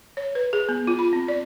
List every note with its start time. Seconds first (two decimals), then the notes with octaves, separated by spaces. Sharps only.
0.17 C#5
0.35 B4
0.53 G#4
0.69 B3
0.87 F4
0.99 B5
1.13 C4
1.28 D5